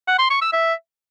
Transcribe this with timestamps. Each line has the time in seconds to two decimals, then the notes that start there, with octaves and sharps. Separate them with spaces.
0.08 F#5
0.19 C6
0.30 C#6
0.42 E6
0.53 E5